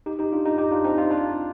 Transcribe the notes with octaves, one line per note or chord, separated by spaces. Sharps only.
D#4 G4
D#4 G4
D4 F4
D#4 G4
D#4 G4
D4 F4
C4 D#4
D4 F4
D4 F4